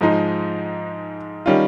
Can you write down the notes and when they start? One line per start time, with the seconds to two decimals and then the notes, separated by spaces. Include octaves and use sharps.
0.01 G#2 F3 G#3 D#4
1.46 D#3 G3 C#4 F4